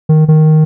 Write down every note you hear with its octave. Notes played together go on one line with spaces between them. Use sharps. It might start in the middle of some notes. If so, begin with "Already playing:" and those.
D#3
D#3